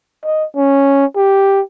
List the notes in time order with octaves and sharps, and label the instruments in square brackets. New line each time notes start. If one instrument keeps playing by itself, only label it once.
[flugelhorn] D#5
C#4
G4